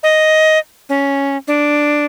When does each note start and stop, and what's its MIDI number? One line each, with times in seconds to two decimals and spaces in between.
0.03 0.59 75
0.89 1.37 61
1.47 2.05 62